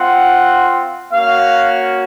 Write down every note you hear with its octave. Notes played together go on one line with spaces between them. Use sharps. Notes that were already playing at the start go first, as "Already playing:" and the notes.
Already playing: C4 F4 F#5
A#3 C#4 F#4 F5